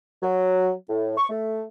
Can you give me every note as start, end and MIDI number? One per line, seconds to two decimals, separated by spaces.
0.22 0.72 54
0.89 1.17 45
1.18 1.28 85
1.30 1.62 57